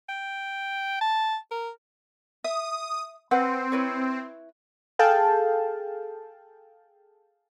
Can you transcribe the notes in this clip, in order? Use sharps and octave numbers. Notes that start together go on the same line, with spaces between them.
G5
A5
A#4
E5 D#6
C4 B4 F#5
E4 B4 C#5
G#4 A4 F5 G5 A5